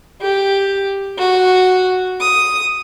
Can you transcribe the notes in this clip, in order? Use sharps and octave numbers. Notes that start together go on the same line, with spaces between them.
G4
F#4
D#6